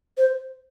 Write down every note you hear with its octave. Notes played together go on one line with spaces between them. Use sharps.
C5